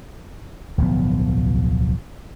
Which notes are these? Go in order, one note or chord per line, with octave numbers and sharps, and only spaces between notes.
D1 B1 F3 B3